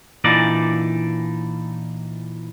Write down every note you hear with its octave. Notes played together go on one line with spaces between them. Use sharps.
A#2 E3 D4 D#4 D5